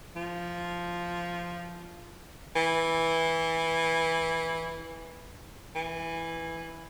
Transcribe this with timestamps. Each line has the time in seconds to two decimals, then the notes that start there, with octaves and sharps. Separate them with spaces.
0.16 F3
2.55 E3
5.75 E3